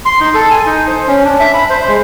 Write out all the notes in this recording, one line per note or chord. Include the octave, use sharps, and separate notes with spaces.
C6
D#4
A4
G#5
D#4
C5
C#4
D4
E5
B5
C5
G#3